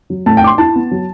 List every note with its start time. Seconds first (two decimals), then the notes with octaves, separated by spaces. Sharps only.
0.10 F#3
0.26 A2 A5
0.37 G5
0.43 D4 D6
0.47 C6
0.58 E4 A5
0.76 B3
0.91 F#3